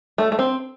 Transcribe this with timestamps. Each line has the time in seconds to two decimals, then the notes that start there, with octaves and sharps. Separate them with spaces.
0.18 A3
0.32 A3
0.39 C4